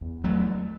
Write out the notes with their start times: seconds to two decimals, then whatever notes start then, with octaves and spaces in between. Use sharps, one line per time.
0.01 E2
0.24 F#3 A3